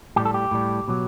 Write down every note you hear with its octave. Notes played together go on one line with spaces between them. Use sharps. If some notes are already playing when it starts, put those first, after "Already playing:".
A2 G3 G4
A4
G4
A2 G3
B2 F#3